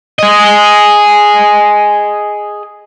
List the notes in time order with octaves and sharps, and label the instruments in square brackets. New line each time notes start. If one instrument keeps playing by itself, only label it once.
[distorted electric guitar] G#4 D#5